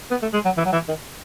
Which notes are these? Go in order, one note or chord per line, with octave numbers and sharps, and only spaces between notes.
B3
A3
G#3
F#3
E3
F#3
E3
D#3